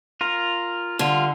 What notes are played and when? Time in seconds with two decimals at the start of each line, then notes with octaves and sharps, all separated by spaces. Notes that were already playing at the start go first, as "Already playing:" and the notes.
0.21 F4 A#4
0.99 D3 G3 F4